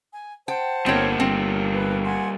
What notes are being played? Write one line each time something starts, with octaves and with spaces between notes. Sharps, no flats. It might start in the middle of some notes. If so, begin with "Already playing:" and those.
G#5
C5 F#5 G5 A5
G1 G3 A#3 C4 C#5
G1 C4
B4
F#5 G#5 C6